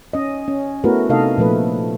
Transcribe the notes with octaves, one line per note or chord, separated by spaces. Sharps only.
C#4 D#5
C#4
A3 B3 E4 F#4 A#4 B4
C3 A3 D#4 A4 D#5 F5
A#2 F3 A3 B4